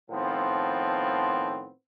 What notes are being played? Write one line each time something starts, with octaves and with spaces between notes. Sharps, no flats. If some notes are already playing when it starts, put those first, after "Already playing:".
A2 D#3 F3 B3 C4